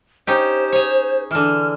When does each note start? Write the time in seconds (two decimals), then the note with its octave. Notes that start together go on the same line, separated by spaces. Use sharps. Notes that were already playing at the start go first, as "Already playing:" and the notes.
0.27 C#4 D#4 G4 C5
0.72 G#4 C#5
1.31 D3 E3 F6